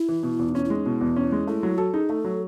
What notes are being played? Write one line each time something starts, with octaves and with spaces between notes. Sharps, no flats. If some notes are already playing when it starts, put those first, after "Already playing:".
Already playing: E4
E3
B2
E2
D#4
C#4 E4
E4
G#3
D#4
B2 E4
E2
C#4
G#3
A3 E4
F#3
F#4 A4
D#4 G#4
A3 A4
F#3